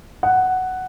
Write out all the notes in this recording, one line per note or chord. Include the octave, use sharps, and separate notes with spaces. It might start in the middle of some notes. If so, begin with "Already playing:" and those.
F#5